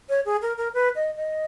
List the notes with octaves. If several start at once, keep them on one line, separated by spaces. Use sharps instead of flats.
C#5
G#4
A#4
A#4
B4
D#5
D#5